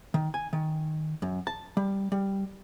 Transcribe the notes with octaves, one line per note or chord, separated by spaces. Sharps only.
D#3
G#5
D#3
F#2
A5
G3
G3